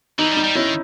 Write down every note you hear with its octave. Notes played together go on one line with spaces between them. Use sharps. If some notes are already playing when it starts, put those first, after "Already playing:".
E3 D#4
G3
D#4
G3
D#3 C#4 E4